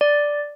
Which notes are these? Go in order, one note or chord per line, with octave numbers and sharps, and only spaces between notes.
D5